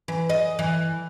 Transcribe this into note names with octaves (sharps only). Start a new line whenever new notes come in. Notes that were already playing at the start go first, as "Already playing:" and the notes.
E3
D#5
E3